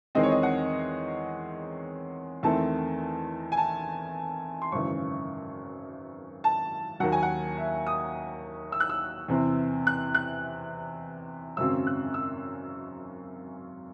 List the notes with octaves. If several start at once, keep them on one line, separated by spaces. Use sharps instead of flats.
E2 D#3 G#3 C4 D#5
C#5
D#5
F#5
E2 D#3 A3 C4 A5
G#5
A5
C6
G#1 F#2 C#3 E3 C#6
A5
D#2 D#3 F#3 F#5
G#5
F#5
E5
D#6
E6
F#6
E6
E2 C3 E3 C4
F#6
F#6
G#1 F#2 C#3 F#3 C4 E6
F#6
E6